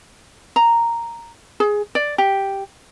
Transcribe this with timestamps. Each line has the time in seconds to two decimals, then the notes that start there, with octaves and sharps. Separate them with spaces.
0.56 A#5
1.60 G#4
1.95 D5
2.18 G4